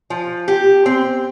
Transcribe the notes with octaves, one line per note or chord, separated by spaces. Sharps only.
F3
G4
C4